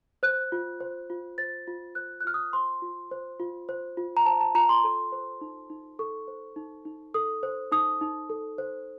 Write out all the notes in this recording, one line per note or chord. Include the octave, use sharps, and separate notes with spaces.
C5 F#6
F4
C5
F4
C5 A6
F4
C5 F#6
F#6
F4 F6
D#6
C5 C6
F4
C5
F4
C5
F4
A#5
C5 A5
A5
F4 A#5
C6
A4
C5
D#4
D#4
A4 C#6
C5
D#4
D#4
A4 D#6
C5
D#4 D#6
D#4
A4
C5